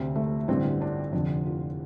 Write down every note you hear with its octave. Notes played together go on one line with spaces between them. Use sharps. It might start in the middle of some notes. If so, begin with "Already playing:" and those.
Already playing: D2 C3 C4
A3
A1 G2 D3 C4
D4
F1 F2 D3
F4